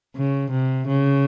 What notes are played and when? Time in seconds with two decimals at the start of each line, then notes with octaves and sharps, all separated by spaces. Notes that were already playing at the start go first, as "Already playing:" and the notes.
0.16 C#3
0.51 C3
0.88 C#3